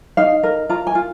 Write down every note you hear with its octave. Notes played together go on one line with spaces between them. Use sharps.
D#4 F5
A#4
F4 A#5
G#5
F4